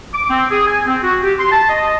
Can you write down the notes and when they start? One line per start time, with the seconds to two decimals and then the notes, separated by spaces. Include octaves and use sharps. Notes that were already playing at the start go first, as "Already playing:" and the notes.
0.13 D6
0.29 C4
0.51 G#4
0.67 G#5
0.87 C4
1.03 F#4
1.23 G4
1.39 C6
1.51 A5
1.69 D#5